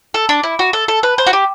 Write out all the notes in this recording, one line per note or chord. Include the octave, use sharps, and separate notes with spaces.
A4
D4
E4
F#4
A4
A4
B4
C5
F#4
G4